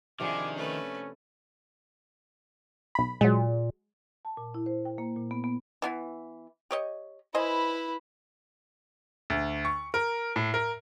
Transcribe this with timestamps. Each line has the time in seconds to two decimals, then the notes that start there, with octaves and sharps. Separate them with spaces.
0.20 C3 D#3 F3 D4 E4 G#4 D6
0.56 A3 C#4 B4
2.95 B1 B5
3.21 A#2 F#3 G#3
4.25 A5
4.37 A#2
4.54 E4
4.66 C5
4.85 G5
4.98 A#3
5.16 A#2
5.31 B3
5.44 B3
5.82 E3 B3 E4
6.71 G4 C#5 D#5
7.35 E4 B4 C5 D#5 G#5
9.30 D2
9.65 C#6
9.94 A#4
10.36 A2
10.54 A#4